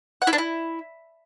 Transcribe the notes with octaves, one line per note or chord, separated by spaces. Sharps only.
F#5
E4
D4
E4